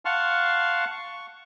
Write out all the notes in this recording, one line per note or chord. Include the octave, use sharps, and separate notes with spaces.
F5 F#5 A5 C6 C#6 F6
C#6